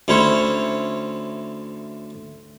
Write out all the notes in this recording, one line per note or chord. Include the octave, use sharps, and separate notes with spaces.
D2 C#4 E4 C5 C#5